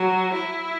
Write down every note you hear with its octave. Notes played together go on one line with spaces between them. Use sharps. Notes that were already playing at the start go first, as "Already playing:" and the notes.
Already playing: F#3
E4